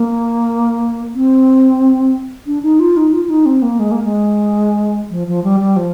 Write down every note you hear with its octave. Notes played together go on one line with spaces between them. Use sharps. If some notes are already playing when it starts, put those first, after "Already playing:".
Already playing: A#3
C4
D4
D#4
F4
D#4
F4
F4
D#4
C4
A#3
G#3
A#3
G#3
F3
F3
G3
G3
F3